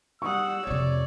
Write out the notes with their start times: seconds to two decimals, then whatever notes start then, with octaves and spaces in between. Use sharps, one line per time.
0.22 G3 F#5 C#6 D#6 E6
0.67 F2 C3 C#5 D5